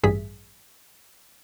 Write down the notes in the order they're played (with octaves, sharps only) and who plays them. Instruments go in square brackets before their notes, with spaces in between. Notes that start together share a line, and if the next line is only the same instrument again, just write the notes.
[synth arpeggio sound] A1 G2 G3 G#4 E5 B6